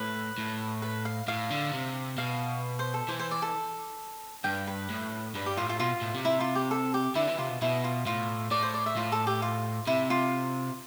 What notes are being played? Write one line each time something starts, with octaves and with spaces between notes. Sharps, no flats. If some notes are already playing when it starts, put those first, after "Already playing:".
Already playing: A2 B4
A2
B4
F5
A2 F5
D3
C3
B2 F5
C5
A4
E3 C5
C5
D5
A4
G2 G5
B4
A2
G2 B4
G4
A2 F4
F4
B2 F4
A2
C3
E4
F4
G4
A4
G4
D3 E4
E3
C3 F4
B2
B2 E4
F4
A2 F4
A2 D5
C5
D5
E5
A2 F4
A4
G4
F4
C3 E4
F4